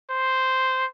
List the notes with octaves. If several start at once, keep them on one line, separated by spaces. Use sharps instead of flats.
C5